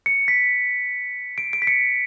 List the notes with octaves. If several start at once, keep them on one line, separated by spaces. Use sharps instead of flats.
C#7
B6
D7
D7
B6
C#7